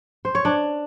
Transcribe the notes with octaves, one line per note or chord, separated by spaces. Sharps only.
C5
C#5
D4